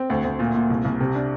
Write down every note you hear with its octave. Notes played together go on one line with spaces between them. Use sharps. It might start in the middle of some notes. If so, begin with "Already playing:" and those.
Already playing: C4
D2
D2
A#2
A#2
C2
C2
C3
D4